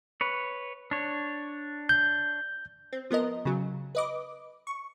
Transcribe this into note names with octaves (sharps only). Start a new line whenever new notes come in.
B4 C#5
D4 C#5
G6
C4
F3 B3 A#4 D#5
C#3 F#3
B4 D#5 D6
C#6